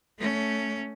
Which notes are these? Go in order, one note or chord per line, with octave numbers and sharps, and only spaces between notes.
A3 C#4